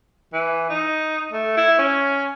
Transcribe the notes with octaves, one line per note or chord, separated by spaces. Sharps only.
E3
D#4
A3
E4
C#4